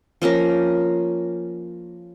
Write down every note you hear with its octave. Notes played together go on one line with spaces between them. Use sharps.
F3 A#3 C#4 A#4